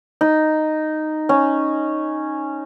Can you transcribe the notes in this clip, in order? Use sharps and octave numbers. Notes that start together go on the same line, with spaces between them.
D#4
C#4